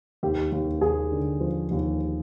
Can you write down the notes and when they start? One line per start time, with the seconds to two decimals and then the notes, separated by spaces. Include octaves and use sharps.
0.23 D#2 G4
0.52 D#2
0.81 D#2 G#4
1.12 D3
1.41 F3
1.71 D#2